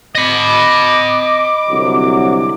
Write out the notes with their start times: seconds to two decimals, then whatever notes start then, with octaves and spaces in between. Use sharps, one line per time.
0.15 D#5 B5 D6
1.70 C2 D3 F#3